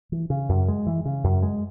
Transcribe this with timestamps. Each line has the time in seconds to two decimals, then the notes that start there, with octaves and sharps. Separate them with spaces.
0.12 E3
0.30 C#3
0.49 F#2
0.68 G#3
0.87 E3
1.05 C#3
1.24 F#2
1.43 G#3